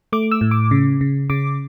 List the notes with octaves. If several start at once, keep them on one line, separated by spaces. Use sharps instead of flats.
A3 D6
E6
A2
D6
C#3
C#3
C#3 D6